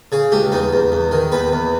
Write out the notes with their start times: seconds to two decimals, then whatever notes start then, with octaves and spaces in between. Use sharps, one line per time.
0.12 C#3 G#4
0.32 C#2 G4
0.52 E2 D#4
0.73 E2
0.92 E2
1.11 D#3
1.32 E2 B4
1.53 E2